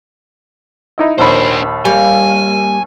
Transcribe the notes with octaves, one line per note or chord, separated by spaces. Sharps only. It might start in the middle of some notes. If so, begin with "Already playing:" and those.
D#4 E4 D#5
A#1 D#2 D4 C5 B5
G3 A#3 G#5